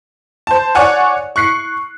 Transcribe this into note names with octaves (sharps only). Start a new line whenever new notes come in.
C5 A5
C#5 D5 F#5 G#5
C#6 F#6 C7 C#7